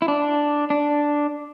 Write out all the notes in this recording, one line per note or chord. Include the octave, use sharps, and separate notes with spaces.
E4
D4
D4